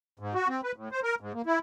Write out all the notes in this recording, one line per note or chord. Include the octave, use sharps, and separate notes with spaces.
G#2
F#4
C4
B4
A2
C5
A#4
G#2
A#3
E4